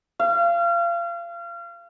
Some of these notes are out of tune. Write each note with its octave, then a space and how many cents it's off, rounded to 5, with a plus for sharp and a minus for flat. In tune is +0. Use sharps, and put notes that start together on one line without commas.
F5 -30